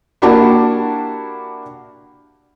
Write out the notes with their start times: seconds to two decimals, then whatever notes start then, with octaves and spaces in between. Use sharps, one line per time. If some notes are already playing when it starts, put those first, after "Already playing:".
0.22 A#3 D4 E4 F#4 G4 A5